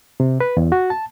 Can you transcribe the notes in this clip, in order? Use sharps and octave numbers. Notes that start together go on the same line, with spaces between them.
C3
B4
E2
F#4
A5